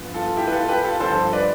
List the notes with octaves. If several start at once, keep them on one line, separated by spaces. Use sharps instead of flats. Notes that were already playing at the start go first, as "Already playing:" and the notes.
Already playing: G2 F3 B3
F4 A4
E4 G4
B4
F4 A4
G4 B4
F4 A4
G2 D3 F3 A4 C5
B4 D5